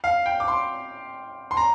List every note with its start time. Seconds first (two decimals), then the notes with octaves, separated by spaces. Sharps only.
0.04 F5
0.26 G5
0.40 D6
0.48 C6
1.51 C6
1.57 A#5